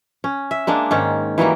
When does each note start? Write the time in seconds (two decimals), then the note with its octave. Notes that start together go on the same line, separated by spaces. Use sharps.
0.24 C#4
0.51 E5
0.67 G#3 A#3 D4
0.91 G#2 D#3 C#4
1.38 E3 F#3 G3 A#3